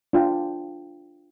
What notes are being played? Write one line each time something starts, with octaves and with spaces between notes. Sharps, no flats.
D4 F4 G5